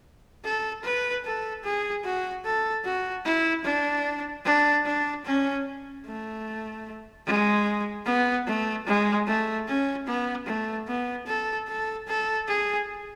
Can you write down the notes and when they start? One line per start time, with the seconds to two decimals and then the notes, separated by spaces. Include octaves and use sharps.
0.44 A4
0.84 B4
1.25 A4
1.64 G#4
2.04 F#4
2.44 A4
2.84 F#4
3.25 E4
3.65 D4
4.45 D4
4.85 D4
5.25 C#4
6.06 A3
7.26 G#3
8.06 B3
8.47 A3
8.87 G#3
9.27 A3
9.67 C#4
10.07 B3
10.47 A3
10.87 B3
11.27 A4
11.68 A4
12.07 A4
12.47 G#4